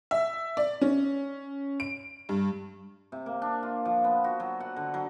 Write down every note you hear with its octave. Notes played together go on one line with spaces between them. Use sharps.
E5
D5
C#4
D7
G2
C3
A#3
D4
F4
F3
B3
F#4
F#3
F#5
D3
F#3